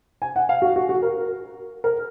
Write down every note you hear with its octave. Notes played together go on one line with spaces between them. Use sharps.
G#5
F#5
F5
F#4
F#4
F#4
A#4
A#4